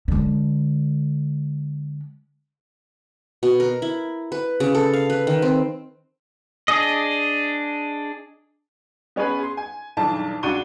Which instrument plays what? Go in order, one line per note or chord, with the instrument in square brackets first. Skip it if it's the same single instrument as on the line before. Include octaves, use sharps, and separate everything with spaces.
[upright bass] D3 G#3
[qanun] B2
A#4
E4
B4
C#3
A4
F5
B4
D#3
C4
[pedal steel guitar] D4 G#4 D#5
[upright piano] B3 C#4 G#4 B4 G#5
G#4 C6
G#5
B1 E2 G2 A5
C#2 D4 F#4 C#6 D#7 G7